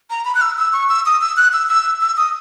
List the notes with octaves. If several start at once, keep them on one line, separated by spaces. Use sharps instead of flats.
A#5
B5
F#6
E6
E6
C#6
E6
D#6
E6
F#6
E6
E6
E6
D#6